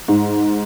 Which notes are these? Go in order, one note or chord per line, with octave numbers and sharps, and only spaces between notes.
G#2